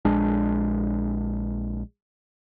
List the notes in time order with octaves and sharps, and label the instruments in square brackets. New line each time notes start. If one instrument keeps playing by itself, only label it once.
[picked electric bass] A#1 G#3 D4